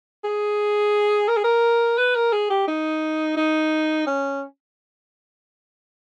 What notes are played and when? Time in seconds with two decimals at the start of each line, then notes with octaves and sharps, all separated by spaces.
0.24 G#4
1.28 A#4
1.36 G#4
1.44 A#4
1.98 B4
2.15 A#4
2.32 G#4
2.50 G4
2.67 D#4
3.37 D#4
4.07 C#4